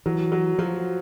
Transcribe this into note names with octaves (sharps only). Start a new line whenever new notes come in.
E3 F#3
F#3
F3 F#3